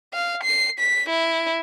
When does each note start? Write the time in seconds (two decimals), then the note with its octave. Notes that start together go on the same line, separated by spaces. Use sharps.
0.14 F5
0.44 C7
0.80 B6
1.10 E4